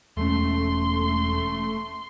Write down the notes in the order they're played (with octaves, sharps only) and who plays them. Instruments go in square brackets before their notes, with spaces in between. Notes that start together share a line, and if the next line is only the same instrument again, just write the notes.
[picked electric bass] E1 G#3 C#4 [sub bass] E2 [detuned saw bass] A3 [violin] C6